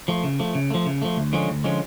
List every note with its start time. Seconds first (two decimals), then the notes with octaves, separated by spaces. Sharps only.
0.08 F3 A3
0.24 C#3
0.40 F3 A3
0.55 C#3
0.70 F3 A3
0.86 C#3
1.02 F3 A3
1.17 D2
1.33 D3 F3 G#3 C#4
1.48 D2
1.64 D3 F3 G#3 C#4